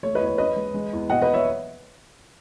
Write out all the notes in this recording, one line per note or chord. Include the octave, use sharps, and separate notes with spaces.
A3 C#5
B4 D#5
E2
C#5
C#4 B4 D#5
G#3
G#3
E2
B2 D#5 F#5
B4 D#5
C#5 E5